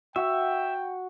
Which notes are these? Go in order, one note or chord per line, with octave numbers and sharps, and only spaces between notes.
F#4 E5 G5